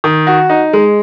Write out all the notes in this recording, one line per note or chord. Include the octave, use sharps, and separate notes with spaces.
D#3
F#4
D#4
G#3